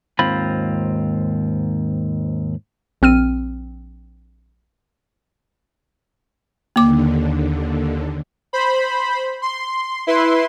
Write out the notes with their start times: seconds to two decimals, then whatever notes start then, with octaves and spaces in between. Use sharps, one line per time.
0.19 D#2 G#2 C4 F4 B5
3.02 A#1 C4 F6 D#7
6.76 D#2 D3 A#3 D6
8.53 C5 B5
9.42 C6
10.07 E4 B4 C6